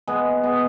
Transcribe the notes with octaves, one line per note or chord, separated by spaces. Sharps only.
G#3 B3
G#3 B3